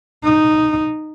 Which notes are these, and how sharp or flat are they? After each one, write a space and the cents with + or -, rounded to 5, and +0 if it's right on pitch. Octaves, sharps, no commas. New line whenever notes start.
D#4 -10